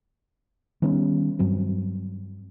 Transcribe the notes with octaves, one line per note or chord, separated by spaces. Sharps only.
D#3 G3 B3 C#4
G2 F#3 C4